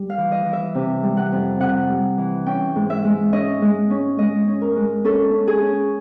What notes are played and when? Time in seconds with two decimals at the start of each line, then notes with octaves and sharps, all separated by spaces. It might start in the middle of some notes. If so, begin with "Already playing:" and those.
Already playing: G3
0.10 F5
0.18 E3
0.32 D#5
0.45 E3
0.53 E5
0.75 C3
1.03 G3
1.17 F#5
1.32 F2
1.60 C3 F#5
1.89 G3
2.18 E3
2.46 C#4 G5
2.76 G#2
2.90 E5
3.04 G#3
3.33 C#4 D#5
3.62 G#3
3.90 C#4
4.19 G#3 D#5
4.48 C#4
4.61 A#4
4.76 G#3
5.04 C#4 A4
5.34 C#4
5.48 G#4
5.62 C#4